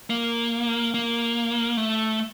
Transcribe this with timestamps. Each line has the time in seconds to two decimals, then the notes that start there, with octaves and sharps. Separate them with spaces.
0.10 A#3
0.94 A#3
1.77 A3